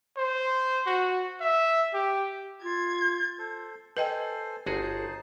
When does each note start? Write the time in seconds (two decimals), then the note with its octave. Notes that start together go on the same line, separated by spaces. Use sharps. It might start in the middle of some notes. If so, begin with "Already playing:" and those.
0.17 C5
0.86 F#4
1.41 E5
1.94 G4
2.62 F4 G#6
3.38 A4 C5
3.97 A4 B4 C5 D#5 G5 G#5
4.66 G1 D#4 F#4 G#4 C5 A5